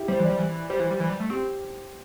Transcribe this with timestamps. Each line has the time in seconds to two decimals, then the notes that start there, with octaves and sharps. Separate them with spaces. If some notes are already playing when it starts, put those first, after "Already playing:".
Already playing: E4 G4
0.08 G3 C5
0.20 E3
0.24 D5
0.30 G3
0.39 E3
0.69 G3 C5
0.80 E3
0.90 G3
1.00 E3
1.10 G3
1.20 A3
1.30 C4 G4